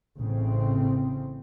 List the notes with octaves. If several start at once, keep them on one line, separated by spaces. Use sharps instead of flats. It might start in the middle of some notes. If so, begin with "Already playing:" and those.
A1 C#3 C4